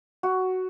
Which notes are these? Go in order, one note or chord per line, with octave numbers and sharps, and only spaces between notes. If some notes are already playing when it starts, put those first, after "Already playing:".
F#4